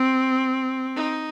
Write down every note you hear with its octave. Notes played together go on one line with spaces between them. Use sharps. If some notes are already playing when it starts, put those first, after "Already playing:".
Already playing: C4
D#4